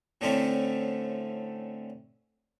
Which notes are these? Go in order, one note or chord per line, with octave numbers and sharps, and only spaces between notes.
A2 D3 A3 C4 C#4 E4